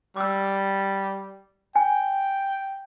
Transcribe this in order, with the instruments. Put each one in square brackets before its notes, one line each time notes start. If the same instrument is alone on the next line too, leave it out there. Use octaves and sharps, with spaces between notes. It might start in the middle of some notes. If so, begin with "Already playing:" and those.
[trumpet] G3 [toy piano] D6 E6
[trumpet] G5 [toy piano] G#5